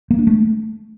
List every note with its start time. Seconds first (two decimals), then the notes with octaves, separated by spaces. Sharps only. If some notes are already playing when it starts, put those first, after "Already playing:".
0.11 A#3
0.19 D4
0.27 A3